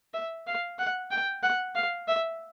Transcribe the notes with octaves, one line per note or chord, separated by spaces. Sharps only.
E5
F5
F#5
G5
F#5
F5
E5